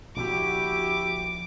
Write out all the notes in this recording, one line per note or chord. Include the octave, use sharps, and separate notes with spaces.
A#1 A#2 D3 E4 F#4 G4 D6